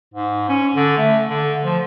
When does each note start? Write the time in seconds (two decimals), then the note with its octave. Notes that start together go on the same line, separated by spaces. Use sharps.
0.14 G#2
0.49 C#4
0.75 D3
0.98 A3
1.29 D3
1.64 F3